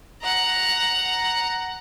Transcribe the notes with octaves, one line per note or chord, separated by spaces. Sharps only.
F#5 A#5